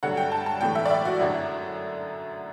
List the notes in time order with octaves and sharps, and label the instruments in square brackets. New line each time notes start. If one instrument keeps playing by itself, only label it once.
[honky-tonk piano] G2 D3 F#3 A3 F#5
G5
A5
A5
A2 E3 A3 G5
E5
D5
E5
F#4
F#2 D3 F#3 A3 E4